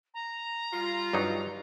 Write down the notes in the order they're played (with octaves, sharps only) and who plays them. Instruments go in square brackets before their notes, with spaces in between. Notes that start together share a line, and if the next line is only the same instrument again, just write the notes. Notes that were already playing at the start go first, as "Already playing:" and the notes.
[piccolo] A#5
[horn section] G3 F4
[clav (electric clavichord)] G2 F#3 D#4